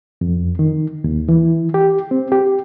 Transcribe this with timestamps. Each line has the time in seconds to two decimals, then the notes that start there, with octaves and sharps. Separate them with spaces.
0.21 F2
0.59 D#3
1.04 D#2
1.29 E3
1.74 G4
2.11 C4
2.32 G4